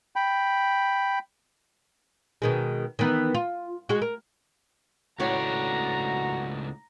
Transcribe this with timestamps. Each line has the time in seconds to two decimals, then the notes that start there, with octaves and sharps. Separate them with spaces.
0.16 G5 B5
2.42 B2 D#3 G#3
2.99 D#3 E3 B3
3.35 F4
3.89 G#3 F#4
4.02 A#4
5.20 C#2 A2 B3 D4 F#4 C#5 A#5